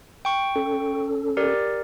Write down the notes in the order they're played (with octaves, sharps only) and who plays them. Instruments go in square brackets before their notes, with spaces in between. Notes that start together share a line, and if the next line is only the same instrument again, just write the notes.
[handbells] G5 C#6
[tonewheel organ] C#4 A4
[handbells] G4 A#4 D5